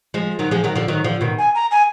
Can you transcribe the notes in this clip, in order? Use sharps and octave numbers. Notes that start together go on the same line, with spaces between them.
F3 G#3
D#3 F#3
F3 G#3
D#3 F#3
D3 F3
D#3 F#3
D3 F3
B2 D#3
G#5
A#5
G#5